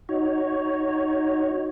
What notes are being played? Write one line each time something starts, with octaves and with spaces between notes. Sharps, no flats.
D#4 F#4 C#5